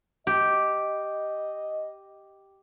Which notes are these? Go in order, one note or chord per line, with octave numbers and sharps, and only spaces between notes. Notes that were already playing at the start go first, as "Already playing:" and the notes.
G4 D#5